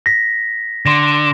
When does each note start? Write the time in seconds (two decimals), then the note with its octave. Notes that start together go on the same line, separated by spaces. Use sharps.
0.06 A#6 B6
0.86 D3 C6 A#6